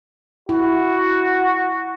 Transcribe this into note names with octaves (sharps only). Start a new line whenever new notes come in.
E4 F#4